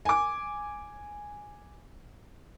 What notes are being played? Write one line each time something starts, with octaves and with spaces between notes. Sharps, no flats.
G#5 D6